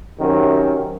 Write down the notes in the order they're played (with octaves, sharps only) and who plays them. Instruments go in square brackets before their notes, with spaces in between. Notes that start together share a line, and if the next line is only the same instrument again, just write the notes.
[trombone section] F#2 C3 D#3